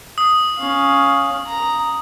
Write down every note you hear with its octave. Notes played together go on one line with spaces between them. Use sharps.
D#6
C#4 F5
A#5